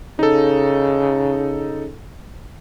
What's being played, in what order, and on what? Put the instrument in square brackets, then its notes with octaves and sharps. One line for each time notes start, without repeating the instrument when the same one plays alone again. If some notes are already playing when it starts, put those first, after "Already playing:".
[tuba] C#3 [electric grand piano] D#4 A4